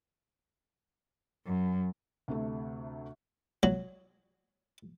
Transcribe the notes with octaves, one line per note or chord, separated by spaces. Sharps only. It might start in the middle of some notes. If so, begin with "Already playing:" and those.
F#2
D2 C3 A3
F#3